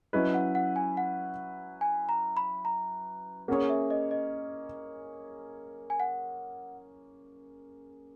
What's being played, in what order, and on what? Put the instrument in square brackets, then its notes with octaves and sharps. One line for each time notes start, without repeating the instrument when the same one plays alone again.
[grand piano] F#3 C#4 E4 B4 [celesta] D#5
[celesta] F#5
F#5
G#5
F#5
G#5
A#5
B5
A#5
[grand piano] A#3 C#4 G#4 C#5 [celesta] F#5
[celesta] E5
D#5
D#5
G#5
F#5